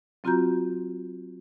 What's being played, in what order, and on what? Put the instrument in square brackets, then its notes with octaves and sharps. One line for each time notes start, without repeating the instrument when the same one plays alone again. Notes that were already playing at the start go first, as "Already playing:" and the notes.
[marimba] F#3 C4 F4 F#4 A#5 G6